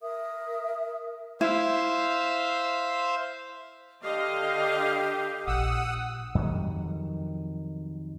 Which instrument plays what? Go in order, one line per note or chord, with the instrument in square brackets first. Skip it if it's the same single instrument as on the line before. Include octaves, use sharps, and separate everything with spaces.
[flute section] A#4 E5 D#6
[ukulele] E4 [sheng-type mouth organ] C5 E5 F5
[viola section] D3 D#5 F5 [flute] G4
[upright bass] A#1 [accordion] F#5 D#6 E6
[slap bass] F2 D#3 F#3 G3